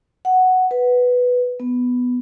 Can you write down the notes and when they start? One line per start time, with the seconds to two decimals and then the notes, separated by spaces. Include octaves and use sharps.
0.25 F#5
0.71 B4
1.60 B3